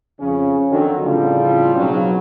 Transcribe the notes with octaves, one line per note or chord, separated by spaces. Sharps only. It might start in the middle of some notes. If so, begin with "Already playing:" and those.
F2 C#3 C#4
D3 D#3 F#3
A2 C#3 F3 G3 C4 F4
B1 C#3 F#3